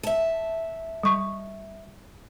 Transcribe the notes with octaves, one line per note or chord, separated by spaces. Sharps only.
E5 A5
G3 C#6